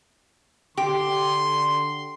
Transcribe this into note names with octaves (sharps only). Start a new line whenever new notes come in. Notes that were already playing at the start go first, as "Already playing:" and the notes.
D3 G4 C6